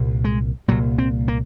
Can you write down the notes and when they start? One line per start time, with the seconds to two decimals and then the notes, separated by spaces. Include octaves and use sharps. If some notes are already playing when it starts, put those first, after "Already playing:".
Already playing: C2 A#2
0.24 G#3
0.68 C2 A#2 F#3
0.98 C4
1.28 A#3